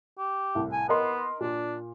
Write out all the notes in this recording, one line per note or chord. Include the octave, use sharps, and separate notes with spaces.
G4
C2 A2
G#5
B3 A#4 D#5 C6
A#2 D4